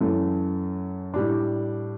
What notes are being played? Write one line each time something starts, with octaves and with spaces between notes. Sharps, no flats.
F#2 E3 A3
A2 G3 D4